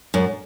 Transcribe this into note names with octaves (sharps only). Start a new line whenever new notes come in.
F#2